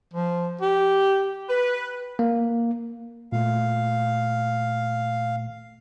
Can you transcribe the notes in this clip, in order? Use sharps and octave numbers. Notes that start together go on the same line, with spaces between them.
F3
G4
B4
A#3
A#2 A3 F5